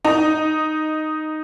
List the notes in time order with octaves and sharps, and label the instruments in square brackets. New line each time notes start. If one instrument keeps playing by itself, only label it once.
[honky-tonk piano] D#4